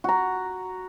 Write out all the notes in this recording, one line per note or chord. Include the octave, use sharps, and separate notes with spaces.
F#4 A#5